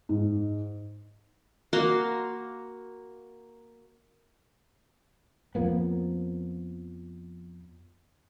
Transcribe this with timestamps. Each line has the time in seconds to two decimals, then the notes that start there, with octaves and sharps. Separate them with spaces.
0.09 G#2
1.73 A#3 F#4 F5 C6
5.55 F2 F3 A#3 B3